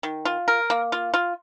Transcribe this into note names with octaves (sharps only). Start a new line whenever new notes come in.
D#3
F4
A#4
A#3
F4
F4